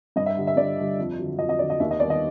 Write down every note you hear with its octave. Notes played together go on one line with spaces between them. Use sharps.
G2 D#5
E5
D3 G3
E5
G2 D5
D3 G3
F2
D3 F#3
F2 D#5
D#5
D3 F#3 D5
D#5
D#2 E5
D#5
D#3 G3 B3 D5
D#5